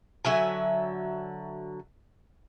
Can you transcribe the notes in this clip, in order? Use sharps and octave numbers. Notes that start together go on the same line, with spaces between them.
D3 F#3 E5 G#5